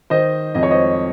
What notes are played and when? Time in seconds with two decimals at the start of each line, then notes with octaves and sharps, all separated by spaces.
0.10 D#3 C5 D#5
0.55 F2 D#5
0.63 C#5
0.71 C5 D#5